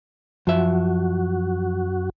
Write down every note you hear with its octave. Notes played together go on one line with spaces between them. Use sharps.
F#2 F3 F#4 E5